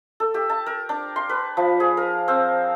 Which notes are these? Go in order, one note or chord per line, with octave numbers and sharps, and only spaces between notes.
A4
G4
A5
A#4
D4
C6
B4
F3
G#4
A#4
C4